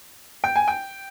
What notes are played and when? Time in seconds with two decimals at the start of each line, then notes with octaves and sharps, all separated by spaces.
0.44 G5
0.56 G#5
0.68 G5